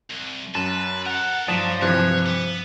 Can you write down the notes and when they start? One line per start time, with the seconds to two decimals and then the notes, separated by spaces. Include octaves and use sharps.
0.10 C2
0.55 F#2 B4 A5
1.06 A4 A#4 F#5
1.48 G2 F3 F#3 D5 A5 D#6 B6
1.82 C3 E3 C5 C#5 F#6
2.26 B3